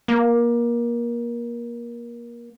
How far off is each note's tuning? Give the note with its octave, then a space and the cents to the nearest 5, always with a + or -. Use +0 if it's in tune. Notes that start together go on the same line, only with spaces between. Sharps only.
A#3 +25